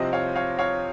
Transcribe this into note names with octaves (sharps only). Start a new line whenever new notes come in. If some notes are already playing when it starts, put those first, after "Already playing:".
Already playing: C2 C3 F3 C4 C5 D#5
C#5 F5
C#5 F5
C#5 F5